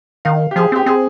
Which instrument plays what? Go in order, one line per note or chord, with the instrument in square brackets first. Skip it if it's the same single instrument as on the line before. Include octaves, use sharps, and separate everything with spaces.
[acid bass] D#3 [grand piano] F5
[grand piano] G4
[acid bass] F3 [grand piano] G#4
[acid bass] C4 [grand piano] G4
[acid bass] C4 [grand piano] G#4